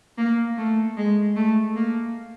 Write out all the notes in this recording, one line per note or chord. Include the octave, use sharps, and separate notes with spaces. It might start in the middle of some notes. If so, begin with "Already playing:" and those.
A#3
A3
G#3
A3
A#3